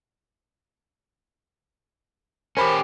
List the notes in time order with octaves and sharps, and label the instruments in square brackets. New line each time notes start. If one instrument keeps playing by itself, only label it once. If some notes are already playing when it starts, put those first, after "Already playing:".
[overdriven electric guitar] C#4 G4 [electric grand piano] A#4 C5 B5